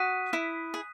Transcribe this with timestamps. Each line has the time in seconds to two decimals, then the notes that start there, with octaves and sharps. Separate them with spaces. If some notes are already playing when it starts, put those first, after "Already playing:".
Already playing: F#4 D#6 F#6 B6 D#7
0.33 E4
0.74 G#4